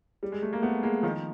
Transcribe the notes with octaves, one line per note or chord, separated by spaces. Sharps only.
G3
G#3
A3
A#3
A3 B3
G#3 A#3
D#3 F3